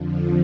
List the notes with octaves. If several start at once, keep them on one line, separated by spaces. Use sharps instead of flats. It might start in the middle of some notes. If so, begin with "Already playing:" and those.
Already playing: F2 D3 F3